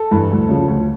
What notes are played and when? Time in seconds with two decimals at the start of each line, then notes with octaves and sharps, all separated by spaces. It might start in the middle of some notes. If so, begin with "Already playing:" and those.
Already playing: A4
0.11 G2 E3
0.30 D2
0.49 C#3 F3
0.68 D2